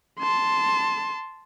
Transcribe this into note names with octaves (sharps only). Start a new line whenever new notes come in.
A5 C6